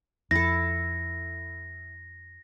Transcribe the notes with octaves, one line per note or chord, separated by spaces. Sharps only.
F2 E4 A4 A#6